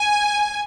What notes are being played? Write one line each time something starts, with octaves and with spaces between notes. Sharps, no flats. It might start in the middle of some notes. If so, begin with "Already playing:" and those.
Already playing: G#5